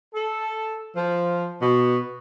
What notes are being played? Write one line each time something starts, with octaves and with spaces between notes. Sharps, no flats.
A4
F3
B2